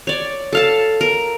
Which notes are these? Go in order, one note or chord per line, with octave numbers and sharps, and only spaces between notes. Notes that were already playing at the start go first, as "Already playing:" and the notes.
C#5 D5
A4 F5 A5
A#4